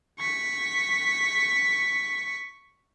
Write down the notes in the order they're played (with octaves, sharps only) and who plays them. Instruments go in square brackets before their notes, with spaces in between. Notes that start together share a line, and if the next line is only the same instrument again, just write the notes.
[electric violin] C#6 B6